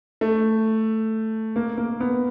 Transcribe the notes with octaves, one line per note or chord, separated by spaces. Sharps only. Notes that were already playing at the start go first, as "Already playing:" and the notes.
A3
A#3
A#3
B3